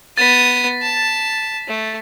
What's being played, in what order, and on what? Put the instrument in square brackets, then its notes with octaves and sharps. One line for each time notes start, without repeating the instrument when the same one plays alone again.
[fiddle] B3 D#6 [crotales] A6 B6
[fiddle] A5
A3